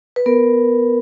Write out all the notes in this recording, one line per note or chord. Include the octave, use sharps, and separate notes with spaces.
B4
B3 A#4